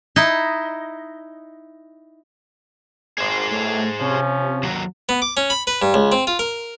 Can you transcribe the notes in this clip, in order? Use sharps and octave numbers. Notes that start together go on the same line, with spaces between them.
D#4 E4 D#5
G#1 G#4 C5
B1 A2 A3
C3 F3 C#4
D#2 F#3
B3
D6
C#4
B5
B4
G2
C#2
C4
F4
A#4